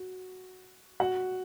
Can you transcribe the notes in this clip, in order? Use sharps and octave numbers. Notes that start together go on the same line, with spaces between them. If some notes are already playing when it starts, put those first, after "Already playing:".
Already playing: F#4
F#4 F#5